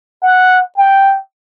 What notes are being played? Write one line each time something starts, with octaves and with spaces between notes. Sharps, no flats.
F#5
G5